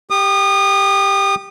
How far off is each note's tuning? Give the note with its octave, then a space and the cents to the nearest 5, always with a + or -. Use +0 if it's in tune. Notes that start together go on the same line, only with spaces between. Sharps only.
G4 +0 D#6 -30